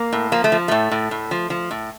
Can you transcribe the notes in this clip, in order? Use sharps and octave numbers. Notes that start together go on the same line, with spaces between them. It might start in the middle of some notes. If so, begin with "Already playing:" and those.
Already playing: A#3
A2
F3 A#3
A3
F3
A2 A3
A2
A2
F3
F3
A2